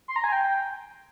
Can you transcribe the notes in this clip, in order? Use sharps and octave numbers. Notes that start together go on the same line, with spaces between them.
C6
A#5
G#5
G5